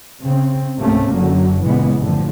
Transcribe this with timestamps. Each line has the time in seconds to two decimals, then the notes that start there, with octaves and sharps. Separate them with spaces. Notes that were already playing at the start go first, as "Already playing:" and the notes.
0.22 C#3 C4
0.79 C#2 G#2 C3 A3 A#3 C#4
1.12 F#1 F#2 D3 F#3
1.63 A#2 C#3 E3 G#3 B3
1.99 F#1 A2 D3 F3